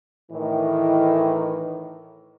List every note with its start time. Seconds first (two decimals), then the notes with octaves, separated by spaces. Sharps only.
0.32 A2 D#3 E3